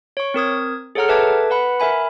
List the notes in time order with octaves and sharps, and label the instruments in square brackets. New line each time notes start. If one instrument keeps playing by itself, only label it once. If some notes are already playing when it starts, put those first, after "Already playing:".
[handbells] C#5 C#6
C4 A#4 D#6 G#6
G#4 A4 C#5 F#5 A#5 F6
A4 B4 E5 A5 D6 G#6
B4 F#5 B5
A#4 E5 G#5 B5